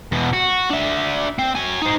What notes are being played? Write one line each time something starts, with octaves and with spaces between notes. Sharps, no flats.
E2 B2
F#4
D4 E5
C4
F#4 G#5
D#4 C5